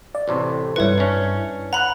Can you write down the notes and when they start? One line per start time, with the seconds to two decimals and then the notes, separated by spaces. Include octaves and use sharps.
0.15 D5
0.28 A1 A2 C3
0.76 G2 E4 B4 C#5 C#7
0.98 C#4 D4
1.73 F#5 A#5 B5 F#6